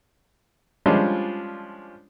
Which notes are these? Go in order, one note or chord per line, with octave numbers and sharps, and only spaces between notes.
F3 G3 G#3 C#4 D4 F4